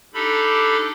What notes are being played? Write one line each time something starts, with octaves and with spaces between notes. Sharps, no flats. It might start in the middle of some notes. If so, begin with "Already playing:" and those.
D4 D#4 G4 A4 B5